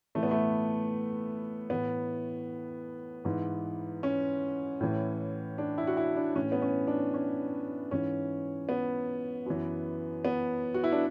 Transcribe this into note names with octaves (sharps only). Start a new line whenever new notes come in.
A2 E3 A3
B3
A3
A2 E3 B3
G#2 E3
C#4
A2 E3
D4
E4
F#4
E4
D4
A2 E3 C#4
B3
C#4
D4
C#4
G#2 E3 C#4
B3
F#2 E3
B3
F#4
E4
D4